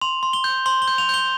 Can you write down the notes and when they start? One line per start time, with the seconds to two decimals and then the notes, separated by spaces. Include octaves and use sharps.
0.01 C6 F7
0.23 C6
0.33 G7
0.44 G6
0.66 C6 G7
0.82 G7
0.88 G6
0.98 F7
1.09 G6 G7